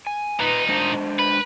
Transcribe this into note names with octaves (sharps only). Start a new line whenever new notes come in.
G#5
A#2 D#4 B4
G#3 D4 C5
B4